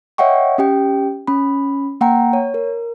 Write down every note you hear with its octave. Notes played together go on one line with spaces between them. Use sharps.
C#5 D#5 E5 F#5 G5 C#6
C#4 G4 G5
C#4 B5
A#3 F#5 G5 A#5
C#5
A#4